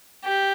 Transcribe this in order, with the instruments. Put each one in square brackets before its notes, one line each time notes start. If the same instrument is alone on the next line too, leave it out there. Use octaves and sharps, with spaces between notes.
[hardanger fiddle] G4